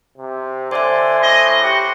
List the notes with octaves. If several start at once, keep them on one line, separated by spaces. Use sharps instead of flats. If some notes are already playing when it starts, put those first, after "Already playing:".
C3
D3 C5 D5 E5 G#5 C6
A2 D#5
F#4 G4 C6 D6